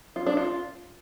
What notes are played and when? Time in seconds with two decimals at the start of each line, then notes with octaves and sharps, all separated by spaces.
0.16 F4
0.26 D4
0.37 F4